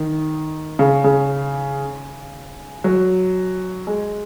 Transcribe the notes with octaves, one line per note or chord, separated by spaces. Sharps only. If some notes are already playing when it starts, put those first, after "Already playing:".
Already playing: D#3
C#3
C#3
F#3
G#3